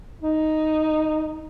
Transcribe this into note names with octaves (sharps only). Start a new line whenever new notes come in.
D#4